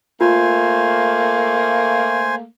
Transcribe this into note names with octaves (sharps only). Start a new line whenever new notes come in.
A3 A#3 F4 C5 G#5